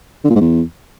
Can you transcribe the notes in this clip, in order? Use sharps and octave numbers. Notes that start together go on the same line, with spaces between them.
D3
A#2
G#2
E2